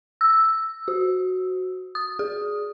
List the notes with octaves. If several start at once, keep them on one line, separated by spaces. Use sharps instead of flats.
E6
F#4
D#6
G#4